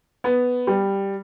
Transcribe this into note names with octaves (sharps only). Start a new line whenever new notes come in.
B3
G3